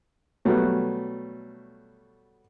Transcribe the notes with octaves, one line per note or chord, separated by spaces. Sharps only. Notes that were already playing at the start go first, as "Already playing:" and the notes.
B2 F#3 G3 A3 B3